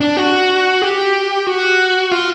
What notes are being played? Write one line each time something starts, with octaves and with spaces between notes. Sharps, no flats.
D4
F#4
G4
F#4
F4